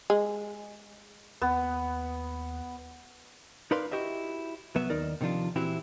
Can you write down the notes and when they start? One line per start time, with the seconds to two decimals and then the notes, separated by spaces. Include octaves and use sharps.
0.10 G#3
1.42 D#2 B3
3.71 D#4 A#4 B4 D5 F5 C6
3.92 E4 F#4 G4 D#5 E5
4.75 C2 F#3 B3 B4 E5
4.90 D#2 D#3 D#4 A#4 D5
5.21 C3 D#3 F3 D4 F4
5.55 A#2 E3 C4 E4 F#4 G4